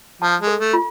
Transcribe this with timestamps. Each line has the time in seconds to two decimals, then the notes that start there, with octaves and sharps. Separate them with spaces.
0.22 F3 A5
0.41 G#3
0.47 A4
0.60 A3
0.73 F4